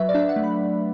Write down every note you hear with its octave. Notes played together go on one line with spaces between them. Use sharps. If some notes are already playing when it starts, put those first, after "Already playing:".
Already playing: F#3 B4 E5
D5
D4 E5
F#5
A3
B5